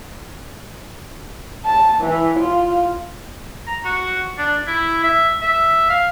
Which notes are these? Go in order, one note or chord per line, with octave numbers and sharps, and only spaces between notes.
A5
E3
F4
A#5
F#4
D4
E4
E5
E5
F5